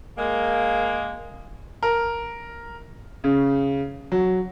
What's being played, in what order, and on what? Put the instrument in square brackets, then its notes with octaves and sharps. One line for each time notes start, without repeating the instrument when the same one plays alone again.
[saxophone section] G#3 A#3
[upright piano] A#4
C#3
F#3